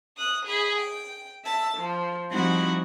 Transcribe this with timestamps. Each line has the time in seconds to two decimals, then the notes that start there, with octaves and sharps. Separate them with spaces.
0.16 D#6 F#6
0.45 G#4 B5
0.78 G5
1.44 E5 A5
1.75 F3
2.31 F3 G3 C4 D#4 E4 F#4